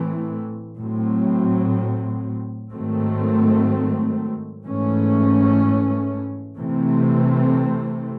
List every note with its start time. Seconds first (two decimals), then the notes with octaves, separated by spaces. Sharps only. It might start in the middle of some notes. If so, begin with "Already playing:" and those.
Already playing: A2 E3 A3 C4
0.79 A2 F#3 C4
2.71 G#2 D#3 F#3 A3 C4
4.64 G#2 E3 A3 C#4
6.57 C3 E3 A3 C4